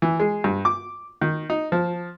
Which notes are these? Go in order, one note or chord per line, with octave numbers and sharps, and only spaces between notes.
E3
G#3
G2
D6
D#3
D#4
F3